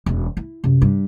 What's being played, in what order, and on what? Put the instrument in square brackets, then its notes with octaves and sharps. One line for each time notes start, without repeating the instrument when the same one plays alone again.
[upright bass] E1 F#2
E4
F#2 C3
G2